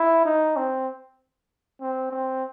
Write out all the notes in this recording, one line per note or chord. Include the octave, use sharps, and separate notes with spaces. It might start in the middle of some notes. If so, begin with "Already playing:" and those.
Already playing: E4
D#4
C4
C4
C4